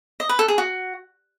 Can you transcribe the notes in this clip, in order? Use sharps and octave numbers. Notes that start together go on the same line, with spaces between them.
D#5
B4
A4
G#4
F#4